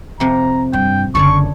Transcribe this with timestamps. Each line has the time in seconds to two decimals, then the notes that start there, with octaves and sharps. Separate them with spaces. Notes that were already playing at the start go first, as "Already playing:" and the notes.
0.20 F2 C3 A#5
0.73 G2 G5
1.15 F#1 D3 A4 C#5 D5 C#6